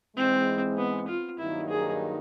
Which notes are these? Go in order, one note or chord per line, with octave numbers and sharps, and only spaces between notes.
G#2 E3 G#3 C4
B3
F4
G2 D#3 F#3 A#3 D#4 E4
G#4